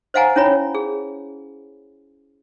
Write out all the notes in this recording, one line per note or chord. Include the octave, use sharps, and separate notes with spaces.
C5 D#5 F5 F#5 G#5 A#5
C#4 E4 C#5 B5
G#4